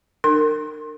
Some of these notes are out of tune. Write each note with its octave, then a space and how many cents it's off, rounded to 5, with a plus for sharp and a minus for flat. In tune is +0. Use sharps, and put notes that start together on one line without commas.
D4 +45 A#4 -30 C6 +25